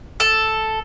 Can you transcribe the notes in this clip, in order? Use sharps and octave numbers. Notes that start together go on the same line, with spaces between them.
A4